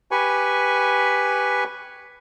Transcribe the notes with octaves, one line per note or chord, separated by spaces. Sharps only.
G4 B4 G#5 B5 C#6